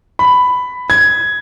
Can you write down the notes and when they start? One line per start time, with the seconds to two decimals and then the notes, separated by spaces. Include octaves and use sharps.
0.19 B5
0.90 G#6